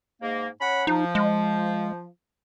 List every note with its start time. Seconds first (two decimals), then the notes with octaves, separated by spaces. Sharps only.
0.22 G#2 A#3
0.60 C#4 F#5 B5
0.87 F3 D#4
1.15 G#3